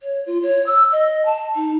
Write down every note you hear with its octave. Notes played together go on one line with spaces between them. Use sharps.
C#5
F4
C#5
E6
D#5
A5
D#4